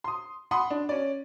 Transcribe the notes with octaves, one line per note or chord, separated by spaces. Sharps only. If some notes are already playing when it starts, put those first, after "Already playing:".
C6 D#6
F#5 B5 C6 D#6
D4
C#4 D5